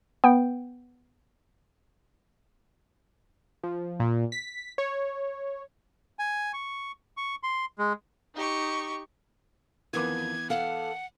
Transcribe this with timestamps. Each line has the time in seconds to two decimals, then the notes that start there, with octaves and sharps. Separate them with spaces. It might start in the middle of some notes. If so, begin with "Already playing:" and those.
0.24 B3 G5
3.63 F3
4.00 A#2
4.32 B6
4.78 C#5
6.19 G#5
6.53 C#6
7.17 C#6
7.43 C6
7.79 G#3
8.35 D#4 G4 C#6
9.93 F2 D#3 E3 B3 D6 G#6
10.50 A4 F5 F#5